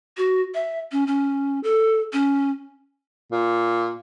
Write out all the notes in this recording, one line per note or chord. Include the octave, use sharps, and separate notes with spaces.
F#4
E5
C#4
C#4
A4
C#4
A#2